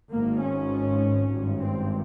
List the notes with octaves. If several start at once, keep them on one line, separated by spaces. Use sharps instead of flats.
G#1 G#2 A#3
C#4
G#1 G2
C4